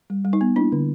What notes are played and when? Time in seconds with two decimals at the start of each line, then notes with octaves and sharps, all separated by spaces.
0.10 G3
0.25 G3
0.33 D#4
0.41 B3
0.56 A#3 D4 E4
0.72 D3